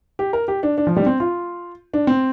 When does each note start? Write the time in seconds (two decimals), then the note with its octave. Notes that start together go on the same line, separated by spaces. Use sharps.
0.19 G4
0.33 A#4
0.48 G4
0.63 D4
0.78 D4
0.87 F3
0.96 G3
1.02 D4
1.06 C4
1.20 F4
1.94 D4
2.07 C4